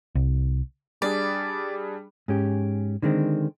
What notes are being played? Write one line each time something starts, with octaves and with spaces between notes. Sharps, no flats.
C2
G3 D4 G#4 D5
G#2 C#4 G4
D3 D#3 G#3 C4